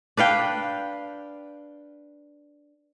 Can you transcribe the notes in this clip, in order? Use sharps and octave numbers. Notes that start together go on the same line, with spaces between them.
D4 B4 F5 G5